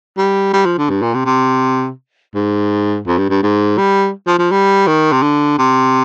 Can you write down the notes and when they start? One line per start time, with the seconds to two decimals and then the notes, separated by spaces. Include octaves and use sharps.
0.17 G3
0.53 G3
0.65 F3
0.78 D3
0.89 G2
1.02 A#2
1.14 C3
1.25 C3
2.34 G#2
3.06 F2
3.18 G2
3.30 G2
3.43 G#2
3.78 G3
4.27 F3
4.38 F3
4.51 G3
4.87 D#3
5.12 C3
5.22 D3
5.58 C3